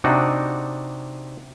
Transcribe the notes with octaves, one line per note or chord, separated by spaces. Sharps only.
C3 D4 D#4 F#4